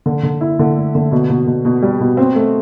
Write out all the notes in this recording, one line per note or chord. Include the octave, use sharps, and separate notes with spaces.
D3
D3
E4
D3
A3
D3
B2
B2
B2
B2
G3
B2
C4
A3